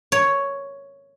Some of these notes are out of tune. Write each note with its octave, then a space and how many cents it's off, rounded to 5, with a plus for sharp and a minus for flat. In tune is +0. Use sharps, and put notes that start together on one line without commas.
C#5 +5